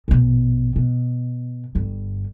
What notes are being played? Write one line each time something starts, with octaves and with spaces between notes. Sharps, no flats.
A#1 B2
B2
G1 G2